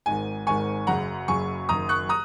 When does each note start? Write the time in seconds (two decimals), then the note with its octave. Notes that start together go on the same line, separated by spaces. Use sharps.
0.06 G#1 G#2 D#3 G#5
0.47 G#1 G#2 D#3 G#5 C#6
0.87 F#1 F#2 C#3 F#5 A#5
1.28 F#1 F#2 C#3 G#5 C#6
1.69 F#1 F#2 D#3 A#5 D#6
1.89 C#6 F#6
2.09 A#5 D#6